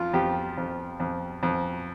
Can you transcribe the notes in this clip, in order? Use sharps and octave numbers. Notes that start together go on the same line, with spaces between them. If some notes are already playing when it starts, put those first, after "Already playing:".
Already playing: F2 F4
F2 G4
F2
F2
F2